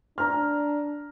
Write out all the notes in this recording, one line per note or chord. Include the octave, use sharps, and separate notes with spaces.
D4 A#5 F6